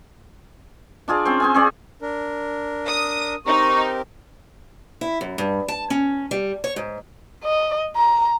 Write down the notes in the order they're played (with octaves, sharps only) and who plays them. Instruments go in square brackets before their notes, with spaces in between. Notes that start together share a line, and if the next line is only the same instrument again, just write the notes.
[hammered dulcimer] D4 F4 G#4 D5
C4 C#4 C5
C4 G#4 G#5
C4 G#4 D5
[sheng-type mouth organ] D4 A#4
[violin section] D#6
[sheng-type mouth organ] C4 G4 A#4 [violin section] D#4 [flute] C#6
[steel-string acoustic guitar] E4
F#2
G2
A5
C#4
G3
C#5
G#2
[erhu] D#5
A#5